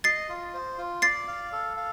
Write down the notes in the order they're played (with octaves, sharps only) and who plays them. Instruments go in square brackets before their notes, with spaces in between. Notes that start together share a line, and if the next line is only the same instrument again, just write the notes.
[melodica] D#5 [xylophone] A6 C7
[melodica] F4
C5
F4
[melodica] D5 [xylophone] A6 C7
[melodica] F5
A4
F5